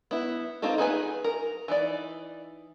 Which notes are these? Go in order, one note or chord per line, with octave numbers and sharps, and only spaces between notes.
B3 E4
A#3 C4 D#4 F4 A4
D#4 G#4 B4 G#5
A#4
E3 D#4 D5